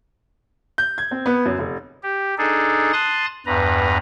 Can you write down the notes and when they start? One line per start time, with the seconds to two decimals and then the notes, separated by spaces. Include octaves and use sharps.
0.78 G6
0.98 G#6
1.11 C4
1.26 B3
1.46 F#2
1.59 F1
2.03 G4
2.38 D4 D#4 G#4 A4
2.93 A5 C6 D#6 F#6 A6
3.46 E2 G2 B4 A#5